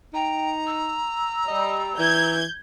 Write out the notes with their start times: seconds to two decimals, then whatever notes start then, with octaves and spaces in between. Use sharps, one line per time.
0.14 D#4 G5 A#5
0.66 E6
1.48 G3 D#5
1.99 E3 G6 G#6